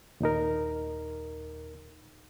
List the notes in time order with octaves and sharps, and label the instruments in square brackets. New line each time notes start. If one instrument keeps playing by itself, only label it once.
[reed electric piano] D#2 A#2 D#4 A#4